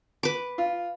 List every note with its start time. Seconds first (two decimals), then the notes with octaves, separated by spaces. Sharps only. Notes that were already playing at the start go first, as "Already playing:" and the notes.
0.23 B4 D6
0.58 F4